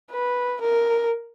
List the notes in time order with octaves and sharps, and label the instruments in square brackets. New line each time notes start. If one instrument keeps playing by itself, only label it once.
[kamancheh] B4
A#4